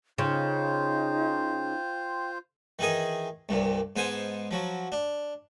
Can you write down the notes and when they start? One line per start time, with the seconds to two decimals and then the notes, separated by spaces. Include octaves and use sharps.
0.18 C#3 D#4 F4 C5 G5
2.79 D#3 E3 D#4 G#4 D#6
3.49 C2 G2 A#2
3.96 G#2 B3 C5 G#5 A5
4.51 F3 F#3
4.92 D4